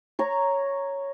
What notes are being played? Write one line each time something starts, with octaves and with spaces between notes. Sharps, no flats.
C#5 A#5